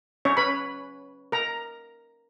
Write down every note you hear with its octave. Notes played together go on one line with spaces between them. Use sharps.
C#4 C#5
B4 B5
A#4 A#5